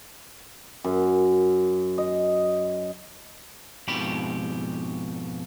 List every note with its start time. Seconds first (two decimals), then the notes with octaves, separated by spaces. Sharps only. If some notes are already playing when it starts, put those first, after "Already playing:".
0.84 F#2
1.98 D#5
3.88 F2 G#2 B2 G4 B5